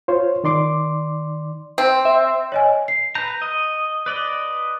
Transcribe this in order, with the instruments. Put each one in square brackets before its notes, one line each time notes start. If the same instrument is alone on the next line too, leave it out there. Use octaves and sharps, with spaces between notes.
[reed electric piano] F4 C5 C#5
D#3 D5 C6 D6
[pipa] C4
[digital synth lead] E5
[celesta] C#5 D#5 G#5
C7
[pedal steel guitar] B4 A#5 [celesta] G6
[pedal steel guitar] D#5
B4 D5 D#5